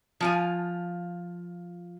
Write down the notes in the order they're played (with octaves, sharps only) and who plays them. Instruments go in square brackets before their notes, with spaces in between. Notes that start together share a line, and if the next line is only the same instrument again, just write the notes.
[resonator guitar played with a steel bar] F3 F4 G#5